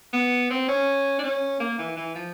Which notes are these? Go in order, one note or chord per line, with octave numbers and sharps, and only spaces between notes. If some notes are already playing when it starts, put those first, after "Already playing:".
B3
C4
C#4
D4
C#4
A#3
E3
E3
F3